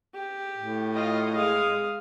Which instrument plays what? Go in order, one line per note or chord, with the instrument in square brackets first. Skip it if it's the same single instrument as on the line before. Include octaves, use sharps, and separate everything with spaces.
[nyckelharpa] G4
[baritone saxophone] A2
[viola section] F4 D#5
[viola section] G#3 [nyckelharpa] F5 D#6